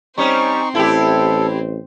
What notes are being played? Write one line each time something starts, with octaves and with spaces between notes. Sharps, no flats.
G3 C4 C#4 D#4 C5 C#6
A1 E4 G4 A4